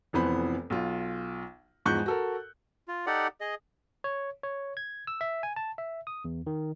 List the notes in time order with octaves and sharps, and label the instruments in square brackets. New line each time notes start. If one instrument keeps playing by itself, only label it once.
[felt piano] F1 F2 E3 B3 C5 B5
B1 F4
E2 G#2 F3 C#6 F#6 G6
F#4 A4 A#4
[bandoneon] F4
D#4 G4 A4 D5 F#5
G#4 D#5
[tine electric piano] C#5
C#5
G#6
E6
E5
G#5
A5
E5
D#6
E2
D#3